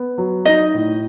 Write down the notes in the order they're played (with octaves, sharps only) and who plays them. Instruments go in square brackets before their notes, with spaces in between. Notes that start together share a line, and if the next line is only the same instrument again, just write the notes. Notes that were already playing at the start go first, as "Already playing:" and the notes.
Already playing: [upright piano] B3
F#3
[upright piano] D#4 [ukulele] D#5
[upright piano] A2